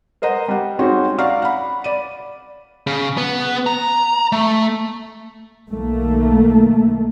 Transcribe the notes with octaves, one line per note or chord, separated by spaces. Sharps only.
A#4 C5 D#5 F#5 A#5
G3 F#5
G#3 C4 C#4 D#4 F#4 G4
D5 F5 F#5 A#5 C#6 F6
F#5 B5
D5 D#7
C#3
B3
A#5
A3
B1 D#3 A3 A#3